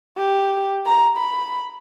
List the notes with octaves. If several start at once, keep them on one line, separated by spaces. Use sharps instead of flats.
G4
A#5
B5